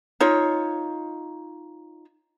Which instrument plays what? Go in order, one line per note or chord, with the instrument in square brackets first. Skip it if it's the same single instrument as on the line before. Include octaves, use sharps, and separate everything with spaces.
[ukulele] D#4 F4 C#5